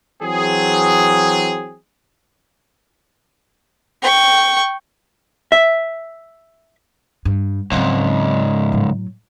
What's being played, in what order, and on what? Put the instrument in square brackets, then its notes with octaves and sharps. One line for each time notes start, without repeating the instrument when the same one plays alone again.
[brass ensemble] E3 F#3 C4 G#4
[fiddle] G5 C#6
[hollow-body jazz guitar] E5
[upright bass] G2
[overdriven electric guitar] C#2 G#2 [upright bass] F#3 C4
[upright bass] A2 F#3